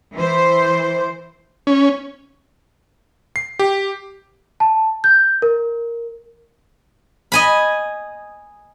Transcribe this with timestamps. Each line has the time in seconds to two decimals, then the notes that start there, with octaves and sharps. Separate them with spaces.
0.15 E3 C5
1.67 C#4
3.36 C7
3.59 G4
4.60 A5
5.04 G6
5.42 A#4
7.32 D#5 G#5 B5